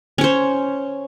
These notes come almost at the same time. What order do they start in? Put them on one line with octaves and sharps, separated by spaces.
C#4 C#5 C5